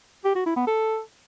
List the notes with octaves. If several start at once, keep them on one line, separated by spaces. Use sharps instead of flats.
G4
F#4
E4
B3
A4